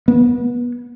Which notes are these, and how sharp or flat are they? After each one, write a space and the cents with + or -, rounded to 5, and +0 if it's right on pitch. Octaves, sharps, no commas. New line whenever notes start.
B3 -30